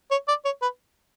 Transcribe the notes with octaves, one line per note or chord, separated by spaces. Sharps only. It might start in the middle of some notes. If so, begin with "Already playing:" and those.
C#5
D5
C#5
B4